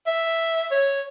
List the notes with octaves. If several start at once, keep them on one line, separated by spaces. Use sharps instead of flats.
E5
C#5